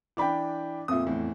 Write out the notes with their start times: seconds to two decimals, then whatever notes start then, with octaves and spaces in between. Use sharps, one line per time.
0.17 E3 D4 G5 B5 D6
0.88 F2 A#2 E5 D#6
1.06 E2 A2